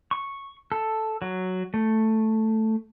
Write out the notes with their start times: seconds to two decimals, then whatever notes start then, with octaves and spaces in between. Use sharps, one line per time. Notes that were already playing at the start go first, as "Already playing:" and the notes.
0.11 C#6
0.72 A4
1.22 F#3
1.74 A3